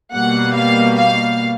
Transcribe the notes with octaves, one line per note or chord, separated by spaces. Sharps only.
B2 G3 A#3 F#5
F5
F5